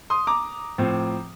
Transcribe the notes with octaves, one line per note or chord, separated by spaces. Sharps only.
C6 D#6
A#5 D6
A2 F3 C4